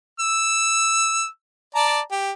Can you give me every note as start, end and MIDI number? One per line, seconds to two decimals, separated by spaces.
0.20 1.27 88
1.75 2.00 74
1.75 2.00 81
1.75 2.00 82
2.12 2.31 67